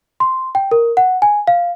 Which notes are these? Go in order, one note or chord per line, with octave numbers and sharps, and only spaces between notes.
C6
G5
A#4
F#5
G#5
F5